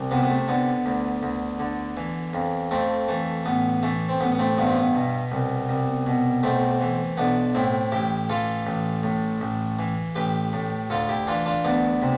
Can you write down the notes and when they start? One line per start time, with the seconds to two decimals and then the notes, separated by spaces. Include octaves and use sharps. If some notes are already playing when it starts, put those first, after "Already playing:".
Already playing: C2
0.11 C3 B3
0.22 B3
0.30 A3
0.48 D3 B3
0.86 D2
1.23 D2
1.60 D3
1.97 E3
2.34 F2
2.71 F2 A3 C4
3.08 E3 A3
3.45 A1 B3
3.83 E3 A3
4.09 C4
4.21 A1 B3
4.32 B3
4.39 A3 C4
4.58 G2 B3
4.67 C4
4.76 B3
4.95 B2
5.32 C2
5.69 C2
6.06 B2
6.43 B1 A3 C4
6.81 E3
7.17 B1 B3 D4
7.55 A2 C4 E4
7.92 A1 E4 G4
8.29 E3 F4 A4
8.67 A1
9.03 A2
9.41 A1
9.79 E3
10.15 A1 G4 B4
10.53 A2
10.90 D2 F4 A4
11.09 E4 G4
11.27 E3 D4 F4
11.46 D4 F4
11.64 D2 B3 D4
12.02 C3